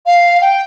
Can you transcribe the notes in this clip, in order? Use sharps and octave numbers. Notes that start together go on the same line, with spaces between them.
F5
G5